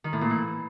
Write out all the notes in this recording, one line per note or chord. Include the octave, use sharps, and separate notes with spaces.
D#3
A2
A#2
E3